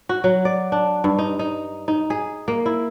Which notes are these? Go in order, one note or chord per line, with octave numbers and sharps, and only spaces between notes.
F#4
F#3
D5
D4
G2
D#4
D#4
D#4
G#4
A#3
E4